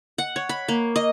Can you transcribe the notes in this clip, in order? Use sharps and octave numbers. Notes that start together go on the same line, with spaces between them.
F#5
C#5
B5
A#3
D#5